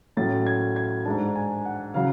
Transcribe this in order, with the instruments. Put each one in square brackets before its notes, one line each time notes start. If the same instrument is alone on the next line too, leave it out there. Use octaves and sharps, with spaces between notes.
[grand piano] A2 F#3 C#4 A6
G#6
G#6
G#2 G#3 D4 A5
G#5
F#5
C#3 F#3 F5